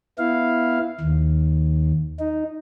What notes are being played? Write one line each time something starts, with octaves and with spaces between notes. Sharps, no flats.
B3 E4 F5
D#2
D#4